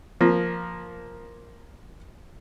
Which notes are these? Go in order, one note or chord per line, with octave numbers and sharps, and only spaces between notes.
F3 A#3